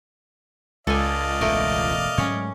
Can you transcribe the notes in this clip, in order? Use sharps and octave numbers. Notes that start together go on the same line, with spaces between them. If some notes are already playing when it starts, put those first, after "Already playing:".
C#2 A4 D5 D#5 F5 G#5
E1 A1 G2 B2 A3 A#4
G#2 F#3 G#3 C#4 C#5